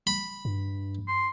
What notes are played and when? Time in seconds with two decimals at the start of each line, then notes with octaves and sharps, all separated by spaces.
0.07 B5
0.45 G2
1.08 C6